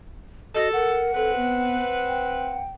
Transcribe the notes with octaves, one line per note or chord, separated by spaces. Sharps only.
F#4 A4 D#5
A#4 F#5
C4 A4 B4
B3
G5